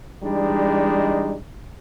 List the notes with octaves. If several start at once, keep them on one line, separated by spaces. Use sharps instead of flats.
E3 G3 G#3 D4 D#4